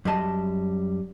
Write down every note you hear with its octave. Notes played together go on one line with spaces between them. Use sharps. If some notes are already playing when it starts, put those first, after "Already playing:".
F#2 G3 G#4 D#5 A5